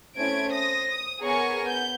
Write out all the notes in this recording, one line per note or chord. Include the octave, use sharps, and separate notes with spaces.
A3 C4 C#4 E4 G#6 D7
C5 D#6 A#6
D#6
B3 G#4 A#4 C#5 G#5 C#6
B3 G6